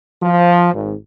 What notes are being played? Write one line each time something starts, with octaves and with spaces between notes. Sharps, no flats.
F3
G#1